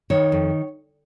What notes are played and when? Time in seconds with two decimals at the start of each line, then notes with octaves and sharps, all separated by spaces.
0.10 D#3 C#5
0.32 F2